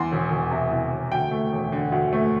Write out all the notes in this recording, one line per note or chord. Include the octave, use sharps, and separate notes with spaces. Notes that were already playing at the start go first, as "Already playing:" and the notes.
Already playing: E2 C6
E1
E1
C3
E2
E1
D2 G5
A3
E1
D3
D2
A3